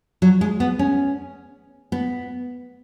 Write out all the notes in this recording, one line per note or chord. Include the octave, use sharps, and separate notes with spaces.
F#3
G#3
B3
C#4
B3